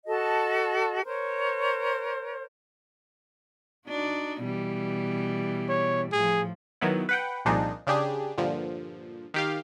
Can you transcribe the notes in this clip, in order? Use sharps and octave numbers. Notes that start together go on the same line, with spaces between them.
F#4 A4 D#5 A5
A#4 C5 C#5
D4 D#4 F#4
B2 E3 G3
C#5
A2 F3 G#4
D#3 F#3 B3 E4
B4 F#5 G5
C2 A#2 F3 D4 D#4 G#4
C#3 D4 G4 G#4
G2 A#2 D3 F3
D#3 G4 F5